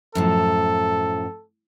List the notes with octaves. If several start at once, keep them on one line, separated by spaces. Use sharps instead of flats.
F#2 A2 F3 A4